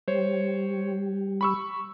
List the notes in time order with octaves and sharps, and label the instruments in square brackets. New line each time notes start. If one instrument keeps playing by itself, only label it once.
[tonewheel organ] G3 [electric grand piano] C5 C#5
[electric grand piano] B5 C#6 E6